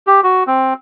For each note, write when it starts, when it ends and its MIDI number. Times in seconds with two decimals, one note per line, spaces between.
0.07 0.21 67
0.23 0.43 66
0.47 0.74 60